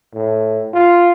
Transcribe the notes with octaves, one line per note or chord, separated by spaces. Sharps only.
A2
F4